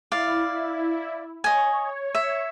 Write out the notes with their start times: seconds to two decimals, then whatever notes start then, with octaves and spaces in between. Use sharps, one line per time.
0.12 E4 D5 F5
1.44 C#5 D#5 G#5
2.15 E5